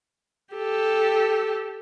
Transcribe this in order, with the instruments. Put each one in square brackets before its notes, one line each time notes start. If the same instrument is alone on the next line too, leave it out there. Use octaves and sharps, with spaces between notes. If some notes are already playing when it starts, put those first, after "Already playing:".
[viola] G4 A4